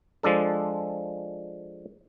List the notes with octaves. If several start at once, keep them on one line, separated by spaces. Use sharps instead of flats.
F3 G#3 D4 A4